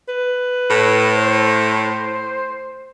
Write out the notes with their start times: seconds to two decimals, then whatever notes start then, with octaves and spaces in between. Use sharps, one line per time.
0.08 B4
0.69 A2
1.16 C5